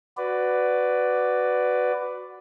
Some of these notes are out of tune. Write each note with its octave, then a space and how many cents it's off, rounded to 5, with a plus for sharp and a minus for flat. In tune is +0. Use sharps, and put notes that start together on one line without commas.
F#4 +0 B4 +10 D5 +0